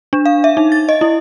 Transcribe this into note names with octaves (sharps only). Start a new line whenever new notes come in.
D4
F5
E5
D#4
A6
D#5
E4